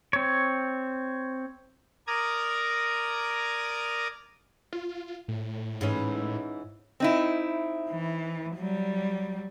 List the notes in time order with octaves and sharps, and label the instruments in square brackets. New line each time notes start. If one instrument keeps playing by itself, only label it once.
[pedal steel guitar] C4 C#5
[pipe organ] A#4 D5 A#5 D#6 G#6
[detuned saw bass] F4
A2
[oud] G#2 E3 C#4
[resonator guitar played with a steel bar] C4 D#4 E4
[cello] E3
F#3 G3